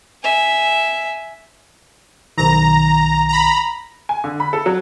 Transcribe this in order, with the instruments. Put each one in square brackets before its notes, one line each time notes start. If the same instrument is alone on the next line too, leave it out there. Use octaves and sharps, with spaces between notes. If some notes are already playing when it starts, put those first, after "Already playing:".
[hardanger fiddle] E5 G#5
[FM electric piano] B1 D#3 [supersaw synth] A#5
[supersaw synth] A#5 B5
[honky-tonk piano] G#5
D3
B5
A4
F#3